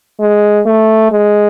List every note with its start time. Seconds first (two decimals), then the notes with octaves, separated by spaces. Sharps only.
0.20 G#3
0.66 A3
1.12 G#3